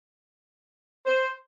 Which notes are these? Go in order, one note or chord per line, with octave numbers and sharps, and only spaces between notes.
C5